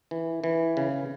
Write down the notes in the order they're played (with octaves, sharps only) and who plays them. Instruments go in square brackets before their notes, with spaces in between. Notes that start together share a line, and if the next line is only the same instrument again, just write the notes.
[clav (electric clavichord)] E3
E3
C#3